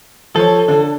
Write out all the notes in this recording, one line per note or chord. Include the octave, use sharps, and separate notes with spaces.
F3 A4 C#5
D3